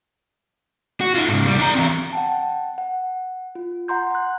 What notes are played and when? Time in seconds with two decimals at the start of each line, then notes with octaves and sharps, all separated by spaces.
1.01 F#4
1.15 D#4 F4
1.28 G#2 C#3
1.46 C2 G3
1.58 D4 A#5
1.74 E3 C4
2.13 F#5 G5 A5
2.78 F#5
3.55 F4
3.88 F#5 A#5 C6 G6
4.11 F#5 F#6